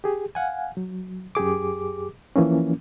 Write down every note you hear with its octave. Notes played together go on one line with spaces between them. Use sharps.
G4 G#4
F5 F#5 G#5
F#3
F#2 G4 G#4 D6
E3 F3 A#3 C#4